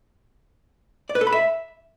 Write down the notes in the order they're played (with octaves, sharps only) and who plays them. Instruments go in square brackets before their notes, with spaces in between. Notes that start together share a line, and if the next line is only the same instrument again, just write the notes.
[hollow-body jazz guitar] D5
B4
A4
B5
E5